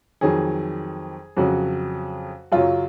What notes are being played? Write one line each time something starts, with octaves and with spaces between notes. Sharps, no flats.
F2 D#3 F#3 G#4
F2 C#3 F#3 F#4
F#2 C#3 F#3 F4